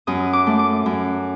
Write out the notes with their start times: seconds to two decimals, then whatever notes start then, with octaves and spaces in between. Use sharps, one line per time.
0.07 F#2 D#6
0.33 D6
0.47 A3
0.59 D6
0.86 F#2